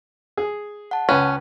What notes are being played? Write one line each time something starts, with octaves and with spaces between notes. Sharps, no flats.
G#4
F#5 A5
C#2 C#4 B4